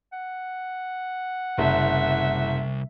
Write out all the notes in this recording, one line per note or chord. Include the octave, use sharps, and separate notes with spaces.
F#5
F#1 C2 E5